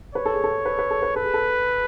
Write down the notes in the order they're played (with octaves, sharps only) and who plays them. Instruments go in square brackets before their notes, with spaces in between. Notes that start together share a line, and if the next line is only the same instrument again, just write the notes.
[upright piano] B4 [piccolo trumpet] C#5
[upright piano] A4
G#4
A4
B4
B4
A4
B4
[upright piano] A4 [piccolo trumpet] B4
[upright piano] G#4
A4